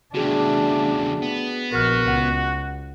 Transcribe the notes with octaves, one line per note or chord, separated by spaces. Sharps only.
E2 C#3 A3 D4 F#4 G#4 G5
B3
A#1 F#4 A#4 F6
C#2 F#5